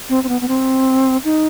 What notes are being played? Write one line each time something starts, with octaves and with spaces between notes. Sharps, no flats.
C4
C4
B3
B3
C4
D#4